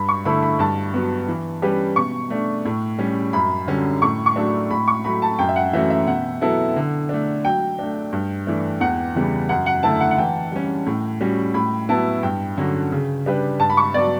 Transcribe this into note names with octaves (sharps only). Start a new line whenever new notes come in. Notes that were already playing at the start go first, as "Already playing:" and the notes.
Already playing: G2 B5
C#6
D3 A3 E4 A4 B5
B5
G2 A5
F#3 B3
E3
G3 C#4 G4 B4
B2 C#6
A3 D4
A2
G3 C#4
F#2 B5
D3 G3 C#4 F#4
A2 C#6
C#6
F#3 A3 D4 A4
A2 B5
C#6
F#3 A3 B5
A5
F#2 G5
E5
F#5
E3 A3 C#4 F#4 E5
E5
B2 F#5
F#3 B3 E4 A4
D3
A3 D4
F#3 G5
A3 D4
G2
E3 A3 D4
E2 F#5
C#3 E3 G3 B3
F#2 F#5
F#5
D3 A3 E4 A5
F#5
F#5
E3 G5
G3 C#4
A2
G3 C#4 F#4
A2 B5
F#3 B3 E4 A5
G2 G5
D3 F#3 C#4 F#4
C#3
G3 D4 G4 B4
G2 A5
B5
C#6
F#3 B3 D5